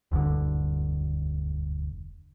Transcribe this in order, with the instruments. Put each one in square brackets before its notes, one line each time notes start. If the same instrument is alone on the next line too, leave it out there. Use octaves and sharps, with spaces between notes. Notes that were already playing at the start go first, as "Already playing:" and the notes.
[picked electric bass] E1 D2 G2 D3